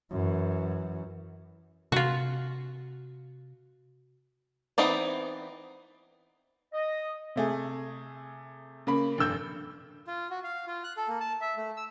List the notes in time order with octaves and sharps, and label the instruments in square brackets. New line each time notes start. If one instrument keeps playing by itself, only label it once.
[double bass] F#2 E3
[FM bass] C3 [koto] F4 F#4
[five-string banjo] E3 B3 C4 D#4 D5
[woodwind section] D#5
[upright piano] C3 A3 G#4
C#3 A#3 B5
F1 G2 E6 G6
[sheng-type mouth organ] F4
F#4
F5
F4
F#6
A4
A#3
A5
E5
A3
E6